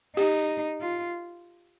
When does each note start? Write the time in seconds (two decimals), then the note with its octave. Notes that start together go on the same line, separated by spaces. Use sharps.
0.16 D#4 G4
0.81 F4